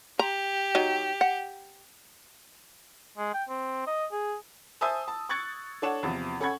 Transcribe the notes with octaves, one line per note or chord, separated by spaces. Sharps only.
G4 A#5
F#3 D#4
F#5
G#3
G5
C4
D#5
G#4
C5 E5 G#5 A5 D#6 E6
A5
C#6 F#6 G#6 A6 C#7
D4 A4 C#5 F#5 A5 E7
E2 C3 F3
C#4 A4 F#5 B5 C#6 G#6